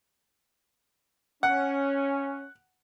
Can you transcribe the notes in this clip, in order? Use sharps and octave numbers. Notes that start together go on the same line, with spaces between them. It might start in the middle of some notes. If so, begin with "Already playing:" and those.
C#4 F#5